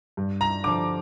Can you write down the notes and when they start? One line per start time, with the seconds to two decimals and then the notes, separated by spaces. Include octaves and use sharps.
0.17 G2
0.41 A#5
0.64 D3 F3 D6